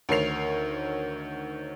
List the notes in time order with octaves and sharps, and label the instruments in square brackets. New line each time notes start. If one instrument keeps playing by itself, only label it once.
[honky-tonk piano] D2 D#3 C#5 C7 F7